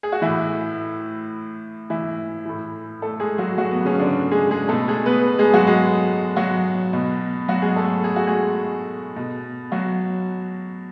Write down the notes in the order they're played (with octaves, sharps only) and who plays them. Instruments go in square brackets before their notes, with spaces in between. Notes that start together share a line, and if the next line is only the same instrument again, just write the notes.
[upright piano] G#4
F#4
A2 E3 E4
E3 E4
A2 E3
A3 A4
G#3 G#4
F#3 F#4
F#3 F#4
B3
C#3 C#4
D3 D4
G#3 G#4
G#3 G#4
B2 A3 A4
G#3 G#4
B3 B4
G#3 G#4
F#3 F#4
G#3 G#4
F#3 F#4
B2
F#3 F#4
G#3 G#4
A3 A4
G#4
F#4
G#3 G#4
B2
F#3 F#4